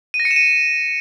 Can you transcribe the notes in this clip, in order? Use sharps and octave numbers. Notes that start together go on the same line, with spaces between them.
D#7
A#6
C#7
E7
D#7